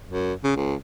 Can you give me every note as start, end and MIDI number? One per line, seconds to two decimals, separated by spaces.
0.10 0.33 42
0.44 0.51 49
0.56 0.74 37